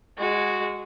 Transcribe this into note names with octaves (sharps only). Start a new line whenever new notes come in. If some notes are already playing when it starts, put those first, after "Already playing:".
G#3 F#4